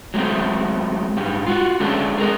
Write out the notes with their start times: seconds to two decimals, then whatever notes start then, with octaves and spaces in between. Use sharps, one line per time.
0.14 F#3 G#3 A3 B3 C4
1.17 G#2 G3
1.47 F4 F#4
1.80 G#3 A3 C#4 D4 G#4 A4
2.18 G#4 A#4 D#5